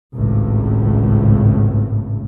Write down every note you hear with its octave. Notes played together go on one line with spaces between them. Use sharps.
G#1 C#2 A2